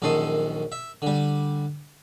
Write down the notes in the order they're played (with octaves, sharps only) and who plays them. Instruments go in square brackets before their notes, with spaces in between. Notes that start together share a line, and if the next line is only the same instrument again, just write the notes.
[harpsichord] A#1 F#2 D#3 A4 C6 D#6
E5
D3 G3